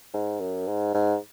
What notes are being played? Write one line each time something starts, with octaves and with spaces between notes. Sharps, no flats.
G#2
F#2
G#2
G#2